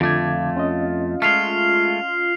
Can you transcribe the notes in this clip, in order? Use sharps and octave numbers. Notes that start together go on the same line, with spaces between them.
F2 D3 A3 F4 D6 G#6
C#4 F4 D#5
G#3 A3 F6 C7 F7